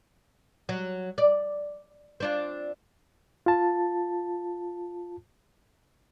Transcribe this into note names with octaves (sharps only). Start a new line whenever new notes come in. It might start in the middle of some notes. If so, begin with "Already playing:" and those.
F#3
D5
C4 D4 F4
F4 A5